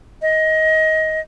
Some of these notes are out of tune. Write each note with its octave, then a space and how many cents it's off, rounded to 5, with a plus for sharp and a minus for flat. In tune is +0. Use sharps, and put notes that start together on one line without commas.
D#5 +20